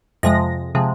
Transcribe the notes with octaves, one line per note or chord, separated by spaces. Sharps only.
F2 C3 F3 G#3 A#6
C3 F3 G#3